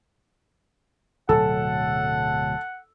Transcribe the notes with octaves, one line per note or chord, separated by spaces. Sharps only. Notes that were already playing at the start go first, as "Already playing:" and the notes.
D1 B2 F#3 A4 F#5